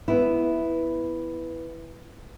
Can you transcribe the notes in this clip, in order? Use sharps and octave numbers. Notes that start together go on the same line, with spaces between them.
B3 E4